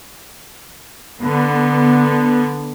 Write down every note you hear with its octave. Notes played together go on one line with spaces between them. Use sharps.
D3 B3